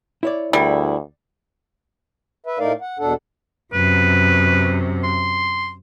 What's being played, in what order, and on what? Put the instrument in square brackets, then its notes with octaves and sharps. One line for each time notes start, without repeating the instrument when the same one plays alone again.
[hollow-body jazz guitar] E4 C#5 D5
[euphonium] D2 [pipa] G3 [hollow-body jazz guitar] E4 G#4 A#4
[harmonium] B4 E5
A2 A3 D#4 A#4 D5 F5
F#5
E2 B2 D4 A4 F#5
[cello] F#2 C3 [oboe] B4
[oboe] C6